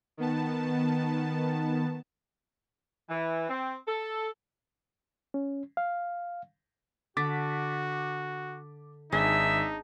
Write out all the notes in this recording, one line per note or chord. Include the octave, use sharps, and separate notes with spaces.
D#3 B3 A5
E3
C4
A4
C#4
F5
D3 F#4 D6 A6 B6
G#1 D4 D#4 G#4 E5